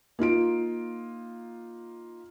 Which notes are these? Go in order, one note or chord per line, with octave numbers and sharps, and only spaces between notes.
A#3 D#4 F4 D7